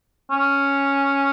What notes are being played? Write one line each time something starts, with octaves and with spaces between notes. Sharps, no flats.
C#4